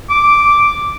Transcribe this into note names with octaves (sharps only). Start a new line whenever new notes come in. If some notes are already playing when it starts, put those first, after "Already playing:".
D6